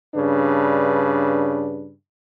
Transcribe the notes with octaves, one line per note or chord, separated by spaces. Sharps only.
G2 C#3 D4 B4